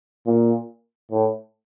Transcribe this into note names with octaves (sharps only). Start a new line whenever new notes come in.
A#2
A2